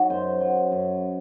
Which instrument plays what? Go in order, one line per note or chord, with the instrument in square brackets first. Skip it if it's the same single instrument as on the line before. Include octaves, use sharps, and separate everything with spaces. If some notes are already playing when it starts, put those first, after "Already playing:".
Already playing: [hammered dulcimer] F#3 D#4 F#4
F#2 C5
F#3
F#2